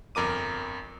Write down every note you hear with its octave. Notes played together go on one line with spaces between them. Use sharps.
G1 F2 A#4 D6 D#7